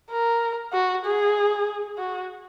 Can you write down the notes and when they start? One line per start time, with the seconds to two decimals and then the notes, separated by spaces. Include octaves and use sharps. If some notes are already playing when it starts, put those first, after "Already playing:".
0.10 A#4
0.73 F#4
1.05 G#4
1.99 F#4